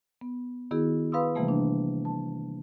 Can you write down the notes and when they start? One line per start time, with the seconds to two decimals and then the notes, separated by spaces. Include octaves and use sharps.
0.21 B3
0.71 D#3 B3 E4 F#4 G#4
1.12 B4 F5 B5 C6 D#6 E6
1.35 C3 E3 G3 A3 A#3
1.48 D4
2.05 A5